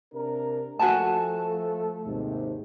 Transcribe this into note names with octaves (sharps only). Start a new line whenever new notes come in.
C3 D4 A#4
F3 A3 F#4 A4 G#5 A5
D#2 G#2 C3